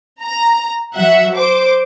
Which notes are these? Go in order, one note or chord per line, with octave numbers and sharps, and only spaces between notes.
A#5
F#3 E5 F#5
C5 D6